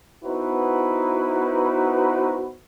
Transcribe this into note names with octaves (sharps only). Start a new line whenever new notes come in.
B3 D#4 E4 F#4 B4 C5